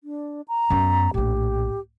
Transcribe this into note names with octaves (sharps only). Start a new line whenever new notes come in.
D4
A#5
F#2 B3
A#1 A2 G4